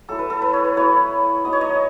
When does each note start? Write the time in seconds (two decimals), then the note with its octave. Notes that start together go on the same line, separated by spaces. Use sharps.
0.08 F#3 A3 E4 A4
0.19 B4
0.30 A4
0.42 B4
0.53 C#5
0.64 B4
0.76 F#3 B3 E4 C#5
1.44 F#3 B3 D#4 D#5
1.53 C#5
1.61 D#5